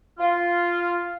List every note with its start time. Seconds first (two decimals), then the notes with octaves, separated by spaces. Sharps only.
0.19 F4